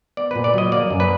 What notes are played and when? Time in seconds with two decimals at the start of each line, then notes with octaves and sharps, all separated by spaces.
0.17 B3 D5
0.31 A#2 B4
0.44 D5
0.54 F#3 D#5
0.72 A#3 D5
0.90 F#2
1.00 B4